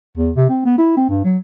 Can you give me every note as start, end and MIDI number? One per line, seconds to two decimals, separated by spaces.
0.17 0.31 40
0.36 0.46 48
0.49 0.61 60
0.65 0.76 59
0.78 0.92 64
0.97 1.09 60
1.10 1.20 43
1.24 1.37 54